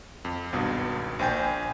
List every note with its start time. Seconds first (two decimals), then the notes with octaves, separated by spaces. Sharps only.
0.25 F2
0.52 G#1 C#2 G2 B2
1.19 A#1 C5 G5 G#5 G6